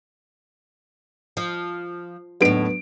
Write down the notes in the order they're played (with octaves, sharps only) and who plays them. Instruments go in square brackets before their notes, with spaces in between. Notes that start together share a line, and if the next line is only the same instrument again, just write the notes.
[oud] F3
[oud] D#2 A2 [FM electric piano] F#3 D4 [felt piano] B3 D7